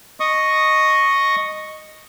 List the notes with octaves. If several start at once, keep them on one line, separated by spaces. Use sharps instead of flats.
D#5 C#6 D#6